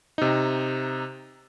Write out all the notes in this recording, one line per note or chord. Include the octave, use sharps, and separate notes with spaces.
C3 D#4